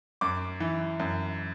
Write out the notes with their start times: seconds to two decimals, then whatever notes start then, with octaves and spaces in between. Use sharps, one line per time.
0.21 F#2 D6
0.60 E3
1.00 F#2